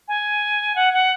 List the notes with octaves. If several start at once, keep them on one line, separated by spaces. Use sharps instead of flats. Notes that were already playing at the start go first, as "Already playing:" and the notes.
G#5
F#5
F#5